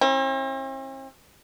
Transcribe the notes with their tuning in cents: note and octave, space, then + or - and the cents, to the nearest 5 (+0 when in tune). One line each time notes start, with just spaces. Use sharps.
C4 +45 E4 -25